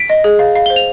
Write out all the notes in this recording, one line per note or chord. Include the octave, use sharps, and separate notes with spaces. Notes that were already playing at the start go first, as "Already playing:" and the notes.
Already playing: B6 D7
D#5
G#4
F5
F5
C5 G7
F7